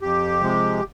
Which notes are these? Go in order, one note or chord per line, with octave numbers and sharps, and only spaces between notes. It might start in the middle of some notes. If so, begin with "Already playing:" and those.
F2 G4
C3 F3 G#3